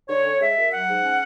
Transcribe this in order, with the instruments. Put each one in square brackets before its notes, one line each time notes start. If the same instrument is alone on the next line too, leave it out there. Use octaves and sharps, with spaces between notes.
[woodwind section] D3 C#5
C#4
G#3 E5
F#2
F#3 F#5
G#2
C#4